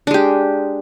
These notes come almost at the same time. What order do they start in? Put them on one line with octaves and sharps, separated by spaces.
D4 G#3 G4